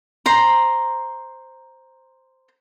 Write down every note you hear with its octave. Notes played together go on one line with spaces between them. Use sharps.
C5 A#5 C6